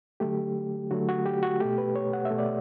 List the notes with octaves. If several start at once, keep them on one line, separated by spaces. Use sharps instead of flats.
D3 F#3 A3 G4
D3 F#3 A3 F#4
F#4
G4
F#4
B2 A3 G4
B4
C#5
F#5
E5
B2 A3
D5